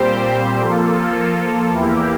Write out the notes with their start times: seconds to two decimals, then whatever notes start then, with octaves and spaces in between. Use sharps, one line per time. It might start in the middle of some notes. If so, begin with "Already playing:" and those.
Already playing: A#2 G3 C4 G4 C5
0.60 F3 A#3 F4 A4
1.71 E2 E3 A#3 E4 G4